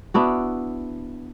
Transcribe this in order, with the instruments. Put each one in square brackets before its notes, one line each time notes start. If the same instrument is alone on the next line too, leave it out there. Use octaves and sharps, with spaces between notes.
[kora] B3 D4 E4 F#4